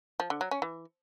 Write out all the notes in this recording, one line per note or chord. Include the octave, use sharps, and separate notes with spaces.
F3
D3
F#3
C#4
E3